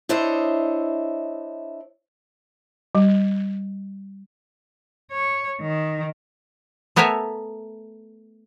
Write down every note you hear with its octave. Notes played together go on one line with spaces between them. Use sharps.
D4 E4 C5 C#5 D#5 E5
G3
C#5
D#3
A3 B3 A#4 C#5 E5 G#5